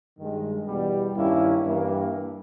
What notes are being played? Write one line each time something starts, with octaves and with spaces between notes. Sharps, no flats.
G2 D#3 G#3
E2 B2 G3
G2 D#3 A#3 C#4 E4
G2 E3 A#3